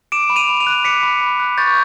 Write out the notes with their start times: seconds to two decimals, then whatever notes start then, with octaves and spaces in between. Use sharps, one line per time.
0.12 D6 D7 E7
0.30 B5
0.36 D#7 F7
0.48 B5
0.60 D#7 F7
0.67 F#6
0.84 D6 B6 C#7
1.03 B5
1.21 B5
1.39 F#6
1.57 C#6 G6 A6